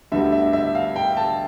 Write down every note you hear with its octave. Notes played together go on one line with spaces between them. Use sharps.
D2 D3 G3 B3 E5
E5
E5
F5
G5
A5